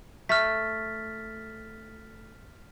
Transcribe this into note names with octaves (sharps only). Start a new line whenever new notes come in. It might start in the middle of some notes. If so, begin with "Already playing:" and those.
A3 F6 A6 B6